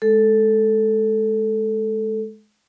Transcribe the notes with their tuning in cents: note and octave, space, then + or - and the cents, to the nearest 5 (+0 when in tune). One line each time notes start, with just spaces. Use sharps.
G#3 +25 A4 +0